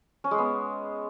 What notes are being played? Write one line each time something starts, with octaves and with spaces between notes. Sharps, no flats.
C#4
G#3
B3